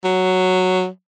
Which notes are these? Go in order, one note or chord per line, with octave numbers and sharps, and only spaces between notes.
F#3